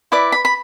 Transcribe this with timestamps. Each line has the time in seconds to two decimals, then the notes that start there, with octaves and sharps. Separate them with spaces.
0.12 E4 B4 D5 D6
0.32 B5
0.45 B5